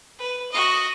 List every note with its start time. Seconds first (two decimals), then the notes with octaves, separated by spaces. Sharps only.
0.19 B4
0.52 F#4 D#5